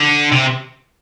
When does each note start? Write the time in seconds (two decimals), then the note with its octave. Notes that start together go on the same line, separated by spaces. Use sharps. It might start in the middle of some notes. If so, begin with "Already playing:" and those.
Already playing: D3
0.32 C3